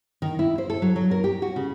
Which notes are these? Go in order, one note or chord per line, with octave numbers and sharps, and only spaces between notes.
D#3
E4
C5
A4
F#3
F#3
A#4
G4
F#4
C#3